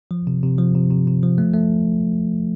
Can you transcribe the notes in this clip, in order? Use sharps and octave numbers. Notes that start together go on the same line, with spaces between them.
F3
C3
C3
F3
C3
C3
C3
F3
A3
A3